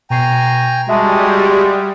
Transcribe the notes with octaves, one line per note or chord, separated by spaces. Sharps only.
B2 G5 G#5 A#5 C#6 C7
G3 G#3 F#4 G#4 E5 A5